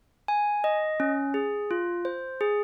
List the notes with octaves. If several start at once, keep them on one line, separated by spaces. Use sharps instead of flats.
G#5
D#5
C#4
G#4
F4
C5
G#4